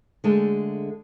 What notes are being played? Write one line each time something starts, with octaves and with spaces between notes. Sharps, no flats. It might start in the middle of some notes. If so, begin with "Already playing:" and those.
D3 G#3 A3